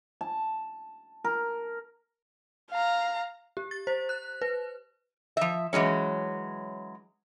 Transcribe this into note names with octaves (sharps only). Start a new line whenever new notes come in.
A5
A#4
F5 A#5
G4
A6
C5
F#6
B4
F3 E5
E3 F#3 G#3 C#4